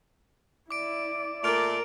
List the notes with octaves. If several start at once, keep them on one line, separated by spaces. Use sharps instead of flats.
E4 D5 D6 D7
A#2 A3 A#4 D5 F6 D7 F7